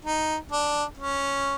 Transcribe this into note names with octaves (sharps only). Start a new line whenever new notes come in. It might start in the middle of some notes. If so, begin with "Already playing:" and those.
D#4
D4
C#4